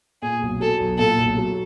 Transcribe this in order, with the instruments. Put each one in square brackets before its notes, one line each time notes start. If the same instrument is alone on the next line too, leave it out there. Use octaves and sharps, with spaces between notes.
[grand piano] A#2 [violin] G#4
[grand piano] B1
[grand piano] F#3 [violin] A4
[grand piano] B1
[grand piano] A#2 [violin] A4
[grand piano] B1
F#3